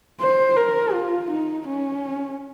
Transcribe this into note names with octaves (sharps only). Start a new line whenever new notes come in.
C5
A#4
F4
D#4
C#4